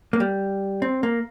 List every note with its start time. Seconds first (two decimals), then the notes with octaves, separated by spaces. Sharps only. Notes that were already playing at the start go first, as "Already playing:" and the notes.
0.13 A#3
0.20 G3
0.82 C4
1.03 A#3